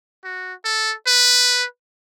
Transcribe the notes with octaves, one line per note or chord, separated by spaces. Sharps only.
F#4
A4
B4